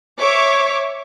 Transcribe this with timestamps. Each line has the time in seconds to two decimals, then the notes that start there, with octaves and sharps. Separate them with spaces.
0.20 C#5 E5 D6